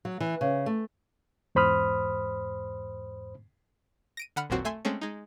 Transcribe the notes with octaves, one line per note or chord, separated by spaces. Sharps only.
F#3
E3
C#3
A3
E2 G#2 C5 B5 D#6 F6
A#6 D7 D#7
D3 F#5 B5 F6
A1 D#2 A#2 F#3 C4 F#4
A3 E5 G#5 C6
G#3 A3 C4 C#4
G#3 D#4